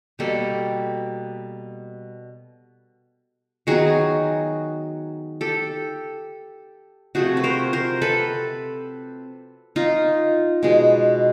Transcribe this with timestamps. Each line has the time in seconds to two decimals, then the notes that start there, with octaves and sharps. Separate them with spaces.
0.19 B2 G3 A#3 G4 A4
3.67 D#3 F#3 B3 F#4 G#4
5.41 G4 A4
7.15 C3 F3 A3 F#4 G#4
7.37 B4
7.44 A#4 C5
7.73 A#4 C5
8.02 A4 B4
9.76 D#4 F4
10.63 B2 G#3 B3